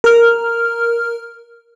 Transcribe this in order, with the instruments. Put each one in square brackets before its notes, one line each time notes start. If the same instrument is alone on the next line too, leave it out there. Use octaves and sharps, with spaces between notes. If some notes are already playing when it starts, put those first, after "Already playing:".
[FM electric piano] A#4 F6